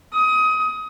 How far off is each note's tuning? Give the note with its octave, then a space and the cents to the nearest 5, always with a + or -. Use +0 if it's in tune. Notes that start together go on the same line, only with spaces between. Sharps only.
D#6 +25